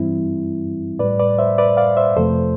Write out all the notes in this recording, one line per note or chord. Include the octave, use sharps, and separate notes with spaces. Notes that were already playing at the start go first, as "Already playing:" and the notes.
Already playing: G2 E3 G3 C4 E4
A2 G3 B4 D5
B4 D5
C5 E5
B4 D5
D5 F5
C5 E5
F2 C3 F3 A3 A4 C5